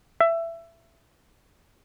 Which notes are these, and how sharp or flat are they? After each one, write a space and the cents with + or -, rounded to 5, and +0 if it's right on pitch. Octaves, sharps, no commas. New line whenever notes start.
E5 +20